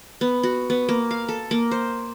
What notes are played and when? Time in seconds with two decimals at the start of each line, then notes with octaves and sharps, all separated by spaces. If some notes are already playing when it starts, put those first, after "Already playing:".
0.21 B3
0.43 F#4
0.70 B3
0.89 A#3
1.11 F5
1.29 A4
1.51 A#3
1.71 C5